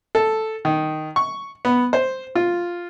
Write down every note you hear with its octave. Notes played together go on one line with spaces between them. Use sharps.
A4
D#3
C#6
B3
C5
F4